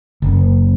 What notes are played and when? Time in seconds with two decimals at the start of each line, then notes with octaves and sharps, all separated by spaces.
0.22 F#1